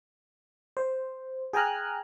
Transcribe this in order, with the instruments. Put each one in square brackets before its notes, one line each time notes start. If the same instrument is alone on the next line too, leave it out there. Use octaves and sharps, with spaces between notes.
[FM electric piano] C5
G#4 G5 G#5 A#5 F6 F#6